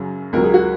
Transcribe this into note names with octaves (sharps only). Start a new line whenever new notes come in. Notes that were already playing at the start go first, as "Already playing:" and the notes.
Already playing: F#2 C#3 F#3
C#2 B2 F#3 A#4
G#4
F#4